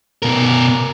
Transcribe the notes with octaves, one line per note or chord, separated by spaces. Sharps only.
B2 A#4